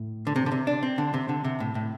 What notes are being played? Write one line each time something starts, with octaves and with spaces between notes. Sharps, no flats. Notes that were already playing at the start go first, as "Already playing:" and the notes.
Already playing: A2
D3
C3
D3
C3
D4
C4
D3
C3
D3
C3
A2
A2